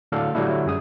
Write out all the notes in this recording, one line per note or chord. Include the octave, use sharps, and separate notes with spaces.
A2 D3 F#3 A4 D5 F5
D3 F#3 G3 A3 D4 E4
F#2 G#4 D#6